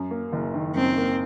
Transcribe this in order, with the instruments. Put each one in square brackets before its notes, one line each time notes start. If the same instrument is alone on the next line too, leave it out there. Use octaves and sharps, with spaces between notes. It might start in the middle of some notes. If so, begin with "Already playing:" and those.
Already playing: [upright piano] F#2
A#3
F#1
D#3
[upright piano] F#2 [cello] C4
[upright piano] A#3